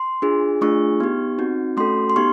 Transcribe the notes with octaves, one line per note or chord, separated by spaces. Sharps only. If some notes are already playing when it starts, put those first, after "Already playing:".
Already playing: C6
D4 F4 G#4
A3 D4 F4 G#4 C#6
B3 D#4 G4
C4 D#4 F#4
A3 C#4 F#4 A4 C6
C6
B3 D#4 G4 C#6